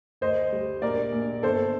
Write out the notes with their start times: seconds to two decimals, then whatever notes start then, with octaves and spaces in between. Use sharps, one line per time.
0.21 D2 C5 D#5
0.52 G3
0.82 A#1 A#4 D5
1.12 A#1
1.43 G1 A4 C5